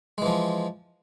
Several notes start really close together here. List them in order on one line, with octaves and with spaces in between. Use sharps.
G#3 E3 F3